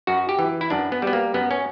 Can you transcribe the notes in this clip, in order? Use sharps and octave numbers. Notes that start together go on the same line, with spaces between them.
F#2 F#4
G4
E3
E4
F#2 D4
B3
G3 B3
A#3
F#2 B3
C#4